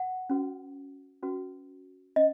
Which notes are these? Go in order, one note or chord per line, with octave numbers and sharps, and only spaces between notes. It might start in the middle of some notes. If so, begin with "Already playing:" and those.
Already playing: F#5
C#4 F#4 B4
C#4 F#4 B4
C#4 D#5